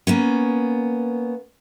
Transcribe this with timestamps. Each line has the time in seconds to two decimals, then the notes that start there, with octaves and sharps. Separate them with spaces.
0.07 A#3 B3 C#4